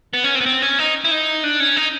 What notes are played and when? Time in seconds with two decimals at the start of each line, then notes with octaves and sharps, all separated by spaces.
0.13 B3
0.24 C#4
0.35 C4
0.41 B3
0.46 C4
0.62 C#4
0.79 D#4
1.04 E4
1.11 D#4
1.44 D4
1.60 C#4
1.77 D#4